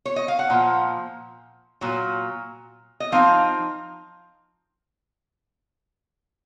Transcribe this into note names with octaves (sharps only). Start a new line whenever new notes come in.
C#5
D#5
F5
F#5
A#2 F3
A#2 F#3
D#5
F3 C4 D#4 F5